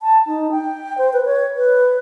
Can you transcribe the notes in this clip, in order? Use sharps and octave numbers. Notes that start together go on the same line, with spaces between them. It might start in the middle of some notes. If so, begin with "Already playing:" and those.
A5
D#4
G5
C5
B4
C#5
B4